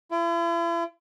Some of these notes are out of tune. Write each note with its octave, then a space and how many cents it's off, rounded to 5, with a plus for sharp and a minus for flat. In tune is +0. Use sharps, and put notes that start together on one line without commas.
E4 +45